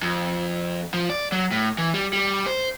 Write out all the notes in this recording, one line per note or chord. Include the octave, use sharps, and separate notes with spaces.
F2
F3
D5
F#3
A2
E3
G3
G3
C5